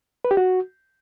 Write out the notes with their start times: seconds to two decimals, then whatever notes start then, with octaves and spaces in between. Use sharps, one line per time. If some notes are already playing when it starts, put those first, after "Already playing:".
0.25 B4
0.31 G4
0.37 F#4